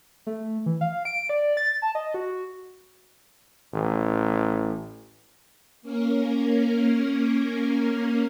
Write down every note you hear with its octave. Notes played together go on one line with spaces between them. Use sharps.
A3
E3
F5
D7
D5
A6
A5
D#5
F#4
A1
A#3 C#4 A#4